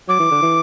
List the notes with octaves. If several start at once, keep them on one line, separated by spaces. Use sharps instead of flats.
F#3 D6
E3
D3
E3